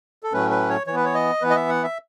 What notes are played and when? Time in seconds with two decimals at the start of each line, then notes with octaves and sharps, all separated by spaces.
0.23 A4
0.32 A2 F#3 A3 C#4 B4
0.50 B4
0.69 C#5
0.87 E3 C#5
0.92 B3 B4
1.05 C#5
1.14 D#5
1.41 E3 B3 B4
1.50 D#5
1.56 E5
1.69 F#5
1.84 E5